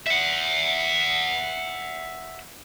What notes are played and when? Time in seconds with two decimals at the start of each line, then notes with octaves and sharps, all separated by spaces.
0.06 E5 F#5